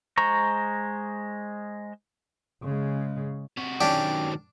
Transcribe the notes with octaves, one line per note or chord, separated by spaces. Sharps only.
G#3 C5 A#5 C#6
C#3 G#3
C3 F#4
D#3 F#3 C#4 D4 G4